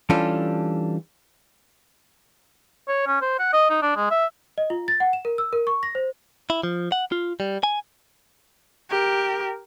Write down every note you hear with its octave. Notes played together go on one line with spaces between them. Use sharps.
E3 G3 C#4 D4 F4 A4
C#5
C#4
C5
F#5
D#5
D#4
D4
G#3
E5
D#5
F4
A6
F#5
E7
A#4
E6
A#4
C#6
A#6
C5
E4
F3
F#5
F4
G3
G#5
G4 A#4